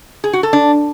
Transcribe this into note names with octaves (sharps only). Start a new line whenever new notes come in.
G#4
F#4
A4
D4